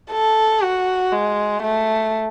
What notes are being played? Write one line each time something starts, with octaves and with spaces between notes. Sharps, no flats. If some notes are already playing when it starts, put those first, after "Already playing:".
A4
F#4
G#3
A3